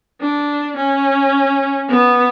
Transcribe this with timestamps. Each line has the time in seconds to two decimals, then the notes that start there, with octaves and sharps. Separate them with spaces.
0.21 D4
0.77 C#4
1.89 B3